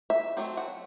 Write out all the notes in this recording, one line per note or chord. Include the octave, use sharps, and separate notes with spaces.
E5
F#3 A3 C4
F#5